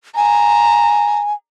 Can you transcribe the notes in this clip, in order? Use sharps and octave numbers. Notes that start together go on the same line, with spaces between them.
G#5 A#5